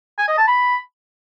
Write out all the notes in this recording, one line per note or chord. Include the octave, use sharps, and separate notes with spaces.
G#5
D#5
A5
B5